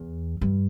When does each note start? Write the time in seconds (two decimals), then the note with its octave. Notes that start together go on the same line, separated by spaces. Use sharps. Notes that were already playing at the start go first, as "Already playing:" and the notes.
Already playing: E2
0.41 G2